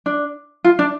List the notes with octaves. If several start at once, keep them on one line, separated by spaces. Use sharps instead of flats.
D4
F4
D4